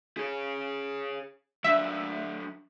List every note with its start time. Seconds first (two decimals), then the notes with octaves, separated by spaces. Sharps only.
0.17 G#4 C#5
1.64 F#3 D4 E5